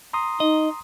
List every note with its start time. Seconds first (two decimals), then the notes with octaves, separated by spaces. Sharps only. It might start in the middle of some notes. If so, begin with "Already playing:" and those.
0.13 A#5 C6 D#6
0.40 D#4 D#5